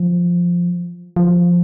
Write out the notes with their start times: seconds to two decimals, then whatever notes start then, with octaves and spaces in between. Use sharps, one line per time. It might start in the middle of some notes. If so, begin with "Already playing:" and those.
Already playing: F3
1.16 F3